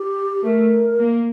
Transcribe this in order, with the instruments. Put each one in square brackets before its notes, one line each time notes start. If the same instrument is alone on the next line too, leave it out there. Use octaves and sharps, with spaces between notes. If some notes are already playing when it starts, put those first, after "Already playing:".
Already playing: [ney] G4
[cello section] A3 [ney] A#4
[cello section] A#3